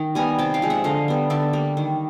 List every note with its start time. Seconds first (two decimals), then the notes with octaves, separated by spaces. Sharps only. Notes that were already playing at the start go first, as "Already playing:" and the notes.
Already playing: D#3
0.15 G3 B3 G#5 A#5
0.39 C3 G5 A5
0.54 F5 G5
0.62 F3 G#3
0.70 E5 F#5
0.84 D3 D#5 F5
1.08 G3 B3
1.30 D3 D5 E5
1.53 G3 A#3
1.77 D#3